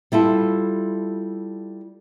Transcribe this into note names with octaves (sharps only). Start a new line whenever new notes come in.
G3 E4 F4 A4